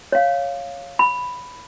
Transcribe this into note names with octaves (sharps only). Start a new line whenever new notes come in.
C#5 F5
B5